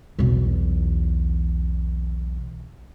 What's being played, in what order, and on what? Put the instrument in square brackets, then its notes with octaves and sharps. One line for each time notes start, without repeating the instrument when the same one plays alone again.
[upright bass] B1 E2